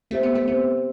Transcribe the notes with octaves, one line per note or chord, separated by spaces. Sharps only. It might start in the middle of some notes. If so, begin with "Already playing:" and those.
A3 C4 G4 C5 E5
B3
A3
B3 C4 G4 C5 E5